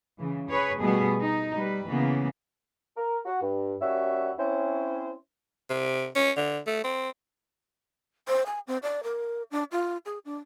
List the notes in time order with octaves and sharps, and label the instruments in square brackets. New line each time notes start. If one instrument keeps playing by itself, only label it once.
[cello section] C#3 E3
G#4 B4 C#5
B2 G3 A3 B3 G#4
D#4
G3 B4
C#3 E3 A#3 B3
[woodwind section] A#4
F#4
G2
D#2 G3 C#4 F#4 E5
C4 C#4 E4 C5
[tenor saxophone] C3
C#4
D3
A3
C4
[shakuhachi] C5
G#5
C4
D5
A#4
D4
F4
G#4
D4